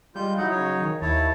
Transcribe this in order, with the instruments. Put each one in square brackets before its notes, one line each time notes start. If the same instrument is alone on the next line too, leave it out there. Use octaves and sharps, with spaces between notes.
[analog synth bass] G3 [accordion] G#3 F4 G6
[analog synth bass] F#3 [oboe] D#4 [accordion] E4 F#5
[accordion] C#3 C#5 [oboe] D#4
[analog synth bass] D#3
[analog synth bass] D#2 [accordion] E4 C#5 [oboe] A5